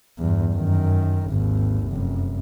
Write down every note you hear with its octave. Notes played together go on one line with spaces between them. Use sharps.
E2 G2
F#2 D#3
G#1 D#2
F1 F#2